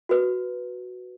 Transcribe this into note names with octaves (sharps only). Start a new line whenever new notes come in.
F#4 B4